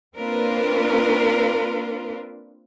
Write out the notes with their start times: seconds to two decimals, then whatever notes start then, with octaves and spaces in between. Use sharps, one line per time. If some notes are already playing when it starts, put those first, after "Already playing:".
0.17 A#3 C4 D4 F4 A#4 B4